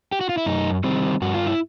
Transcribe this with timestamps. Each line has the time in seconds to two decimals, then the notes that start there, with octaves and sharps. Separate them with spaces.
0.12 G4
0.21 F#4
0.29 F4
0.37 E4
0.46 F#2 D#4
0.84 D#3 G3 C4
1.22 G2 F#4
1.34 F4
1.47 E4